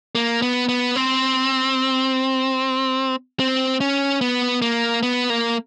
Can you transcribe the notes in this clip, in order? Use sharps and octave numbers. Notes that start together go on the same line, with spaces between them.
A#3
B3
B3
C4
C4
C#4
B3
A#3
B3
A#3